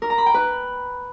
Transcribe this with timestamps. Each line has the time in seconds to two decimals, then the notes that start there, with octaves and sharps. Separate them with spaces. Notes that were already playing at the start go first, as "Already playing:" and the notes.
0.02 A#4
0.10 A#5
0.18 B5
0.26 G5
0.34 B4